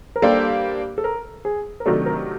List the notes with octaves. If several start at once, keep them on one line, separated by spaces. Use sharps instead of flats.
A#4
G3 A#3 D4 G4 A4 C5
A4
A#4
G#4
A#4
C3 D#3 F#3 A3 D4 A4
A#4